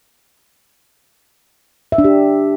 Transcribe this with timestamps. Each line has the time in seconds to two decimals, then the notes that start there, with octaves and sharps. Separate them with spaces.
1.92 E5
1.98 D4
2.04 G4